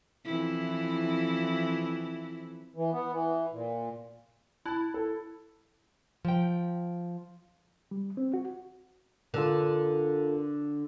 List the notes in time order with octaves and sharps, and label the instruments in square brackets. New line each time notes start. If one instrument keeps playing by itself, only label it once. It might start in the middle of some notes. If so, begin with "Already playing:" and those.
[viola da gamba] F2 E3 E4
[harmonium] E3
B3
E3
A#2
[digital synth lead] E4 [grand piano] A5 F#6
[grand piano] A4
[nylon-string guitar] F3 G5
[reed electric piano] G3
C4
F#4
[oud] D3 [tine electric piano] F4 A4 A#4